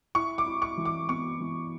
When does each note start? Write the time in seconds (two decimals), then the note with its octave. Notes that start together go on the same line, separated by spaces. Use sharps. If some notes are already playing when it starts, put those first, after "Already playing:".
0.15 E4 C#6
0.38 D6
0.46 E4
0.62 C#6
0.77 E3
0.85 D6
1.09 B3 C#6
1.40 E3